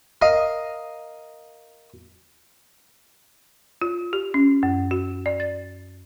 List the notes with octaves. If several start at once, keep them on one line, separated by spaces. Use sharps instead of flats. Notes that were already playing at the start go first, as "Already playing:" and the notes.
A#4 D#5 F5
F4
G4
C#4
F#2
F#4
D5
A6